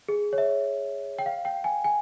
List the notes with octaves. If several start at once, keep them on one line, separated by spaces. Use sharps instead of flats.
G#4
C#5
E5
G5
F5
G5
G#5
G#5